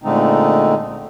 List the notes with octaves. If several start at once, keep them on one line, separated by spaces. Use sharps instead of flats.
A#2 D3 G#3 A3 C4 D#4